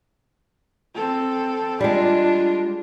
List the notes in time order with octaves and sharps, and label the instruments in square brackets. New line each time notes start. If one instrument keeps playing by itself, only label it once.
[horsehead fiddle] C4 A4
[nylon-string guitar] G3 G#3 [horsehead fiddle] D4 F4